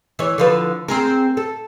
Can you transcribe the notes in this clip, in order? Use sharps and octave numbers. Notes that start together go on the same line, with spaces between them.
E3 C#5
D3 F3 B4
C4 G#4 A#4
A4